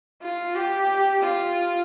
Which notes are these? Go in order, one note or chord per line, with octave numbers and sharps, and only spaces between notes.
F4
G4
F4